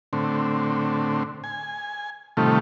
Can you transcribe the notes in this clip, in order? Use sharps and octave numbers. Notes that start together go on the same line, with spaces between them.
A2 D3 C4
G#5
A2 C3 D#3 G3 A3 F4